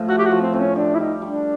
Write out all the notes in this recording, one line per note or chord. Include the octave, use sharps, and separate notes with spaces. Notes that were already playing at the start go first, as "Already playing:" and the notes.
Already playing: A2 F3
A3 F#4
G4
F#4
F3
C4
A2 C4
C#4
D4 G4
E4
G3 D#4
G3 D4